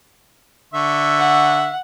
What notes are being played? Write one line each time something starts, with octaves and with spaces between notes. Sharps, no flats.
D3 E5 C#6
F#5